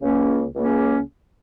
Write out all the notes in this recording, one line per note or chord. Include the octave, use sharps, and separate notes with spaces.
C#2 C#3 A#3 C#4
C#2 C#3 A#3 C#4